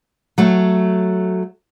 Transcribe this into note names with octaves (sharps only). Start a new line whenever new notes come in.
F#3 A3